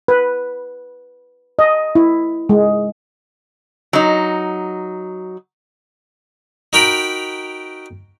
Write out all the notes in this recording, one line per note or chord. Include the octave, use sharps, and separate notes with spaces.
B4
D#5
E4
G#3
F#3 D#4
D#4 F#4 A#4 G5 A#5 B5